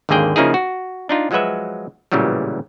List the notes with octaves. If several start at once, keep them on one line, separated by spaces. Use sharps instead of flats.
G#1 D#2 D3 A#3 G#4 G5
C#3 F3 A#3 D#4 E4 G#4
F#4
D4 D#4 F4
F3 F#3 G#3 F#4 B4 E5
A1 A#2 C#3 E3 F#3 G3